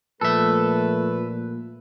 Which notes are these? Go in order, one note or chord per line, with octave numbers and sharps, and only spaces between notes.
A#2 F3 A3 A4 B4 E5